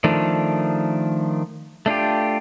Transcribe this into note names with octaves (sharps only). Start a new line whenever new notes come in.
D#3 F3 A3 D4
A3 D4 F4 G4